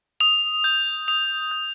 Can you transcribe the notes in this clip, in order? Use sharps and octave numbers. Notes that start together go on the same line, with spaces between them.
D#6 F7
G6
D#6 F7
G6